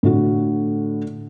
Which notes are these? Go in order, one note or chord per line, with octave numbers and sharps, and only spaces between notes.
A2 D3 F#4